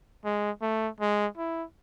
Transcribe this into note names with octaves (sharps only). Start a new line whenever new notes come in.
G#3
A3
G#3
E4